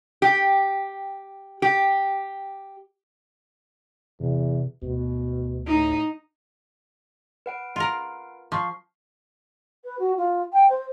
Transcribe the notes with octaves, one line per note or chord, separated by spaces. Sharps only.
G4
G4
E2 C3
D2 B2
A2 D#4
B4 F#5 D7
F4 A#4
F3 C#6 C7
B4
F#4
F4
G5
C5